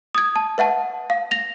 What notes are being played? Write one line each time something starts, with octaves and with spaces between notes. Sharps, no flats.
D#6 G#6
A5
B4 E5 F#5 A5
F5
A#6 F7